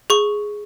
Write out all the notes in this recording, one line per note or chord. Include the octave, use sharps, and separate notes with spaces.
G#4 C#6